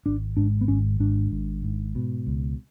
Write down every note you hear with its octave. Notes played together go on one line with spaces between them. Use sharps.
G#1 D4
G#2 D4
B3
G#1 C#4
G#2 D4
G#1
G#2
B2
C#2